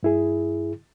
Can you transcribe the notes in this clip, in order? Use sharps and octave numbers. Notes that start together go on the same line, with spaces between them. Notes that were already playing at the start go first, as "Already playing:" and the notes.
G2 E4 G#4